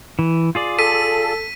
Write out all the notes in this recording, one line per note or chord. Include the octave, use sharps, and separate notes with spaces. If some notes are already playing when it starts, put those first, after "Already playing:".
E3
F4 G#4 D5
A4 B6 D#7